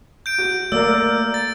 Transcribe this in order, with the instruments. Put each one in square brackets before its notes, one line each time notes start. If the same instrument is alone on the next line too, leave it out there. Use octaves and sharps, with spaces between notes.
[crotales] G6 D7
[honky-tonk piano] F#4
[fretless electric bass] A3 A#3 [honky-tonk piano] A#4 D5 [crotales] E6
[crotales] A6